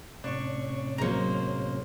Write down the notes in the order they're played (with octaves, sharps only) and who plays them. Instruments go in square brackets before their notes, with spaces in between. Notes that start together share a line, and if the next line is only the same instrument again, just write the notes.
[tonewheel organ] A2 C3 C#4 [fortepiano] D4 [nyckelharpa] C#6
[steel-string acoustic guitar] F#3 G#3 [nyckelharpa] A#3 C5 [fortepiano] A#5